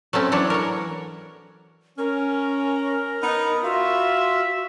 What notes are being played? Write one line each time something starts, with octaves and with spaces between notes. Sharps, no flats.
F#3 A3 C4 C#4
E3 F#3 D4 C#5
A#4 C#5
C#4 A#4
B3 D#4
F4 F#4 E5